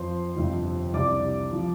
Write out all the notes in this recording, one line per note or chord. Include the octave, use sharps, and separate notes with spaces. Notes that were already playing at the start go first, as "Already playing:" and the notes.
Already playing: F2 F3 C5 C6
G1 F2 C3 F3
C2 C3 G3 D5 D6
F3